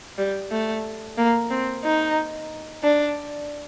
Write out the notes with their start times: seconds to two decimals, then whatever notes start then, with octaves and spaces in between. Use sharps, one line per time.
0.18 G3
0.52 A3
1.17 A#3
1.50 C4
1.84 D#4
2.83 D4